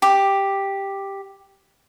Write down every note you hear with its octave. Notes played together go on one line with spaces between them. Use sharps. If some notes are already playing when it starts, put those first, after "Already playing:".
G4 D6